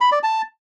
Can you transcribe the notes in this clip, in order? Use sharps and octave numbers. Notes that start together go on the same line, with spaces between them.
B5
D5
A5